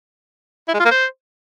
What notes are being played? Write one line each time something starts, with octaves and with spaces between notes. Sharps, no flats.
E4
G#3
F4
A#3
C5